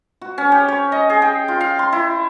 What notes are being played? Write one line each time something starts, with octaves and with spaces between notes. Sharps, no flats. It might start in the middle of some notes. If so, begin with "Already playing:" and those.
F#4
C#4
G4
C#5
D#5
G#4
G5
F4
F5
C6
E4